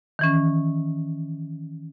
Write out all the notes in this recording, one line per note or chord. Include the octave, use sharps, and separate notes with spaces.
D#3 E3 C#4